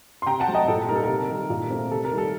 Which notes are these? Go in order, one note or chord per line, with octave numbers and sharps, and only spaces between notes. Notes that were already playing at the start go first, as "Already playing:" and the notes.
C6
C3 G5 A#5
F#5 A5
F#3 A3 C4
D#5 G5
A#2 A4
G3 A#3 D#4 A#4
A4
C3 A#4
D#3 G3
A#2
A3 C4
C3 A4
A#4
D#3 G3
A4